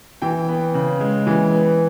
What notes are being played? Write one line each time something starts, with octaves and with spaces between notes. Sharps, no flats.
E3 G5
B3
C#3
G#3
E3
B3